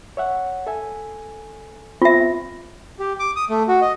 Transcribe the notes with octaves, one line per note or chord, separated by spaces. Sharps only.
C#5 E5 F#5
A4 E5 G#5
B3 C4 F4 E5
G4
D6
D#6
A3
F#4
D#5